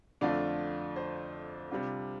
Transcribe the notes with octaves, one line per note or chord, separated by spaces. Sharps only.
F2 D3 A3 D4 F4 D5
C5
C3 G3 D4 F4